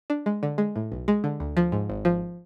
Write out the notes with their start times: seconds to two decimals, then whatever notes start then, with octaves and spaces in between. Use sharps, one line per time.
0.10 D4
0.26 G#3
0.43 D3
0.58 G#3
0.76 A2
0.92 B1
1.08 G#3
1.24 D3
1.40 D2
1.57 F3
1.72 G#2
1.90 G#1
2.05 F3